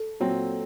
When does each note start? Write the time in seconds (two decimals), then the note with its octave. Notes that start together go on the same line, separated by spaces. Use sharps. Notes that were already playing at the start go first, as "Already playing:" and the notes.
Already playing: A4
0.20 A#2 F#3 C4